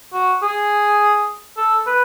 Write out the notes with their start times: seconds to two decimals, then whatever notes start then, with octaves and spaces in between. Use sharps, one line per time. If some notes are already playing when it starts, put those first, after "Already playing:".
0.14 F#4
0.43 G#4
1.57 A4
1.86 B4